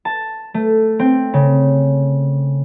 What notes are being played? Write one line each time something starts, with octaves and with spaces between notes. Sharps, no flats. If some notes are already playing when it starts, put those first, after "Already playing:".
A5
A3
C4
C#3